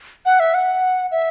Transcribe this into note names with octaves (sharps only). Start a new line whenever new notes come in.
F#5
E5
F#5
E5